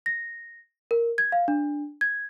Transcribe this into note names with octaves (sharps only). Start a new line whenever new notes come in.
A#6
A#4
G#6
F5
D4
G#6